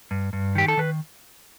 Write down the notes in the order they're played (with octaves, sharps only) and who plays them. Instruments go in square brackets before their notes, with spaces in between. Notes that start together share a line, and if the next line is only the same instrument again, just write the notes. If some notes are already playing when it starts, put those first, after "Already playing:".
[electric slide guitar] G2
G2
D#3 G4
A4
D#3 B4